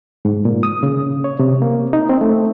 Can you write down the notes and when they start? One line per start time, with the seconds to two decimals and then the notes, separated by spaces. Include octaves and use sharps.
0.25 G#2
0.45 A#2
0.63 D#6
0.83 C#3
1.24 C#5
1.39 C3
1.62 A#3
1.93 D#4
2.09 C4
2.21 A3